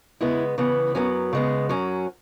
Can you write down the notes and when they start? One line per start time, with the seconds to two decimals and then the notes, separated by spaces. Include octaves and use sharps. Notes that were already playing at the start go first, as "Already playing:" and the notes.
0.21 C#3 G#3 B3 E4
0.58 C#3 E3 B3
0.95 F#2 F#3 B3 C#4
1.33 C#3 G#3 B3
1.69 F#2 F#3 C#4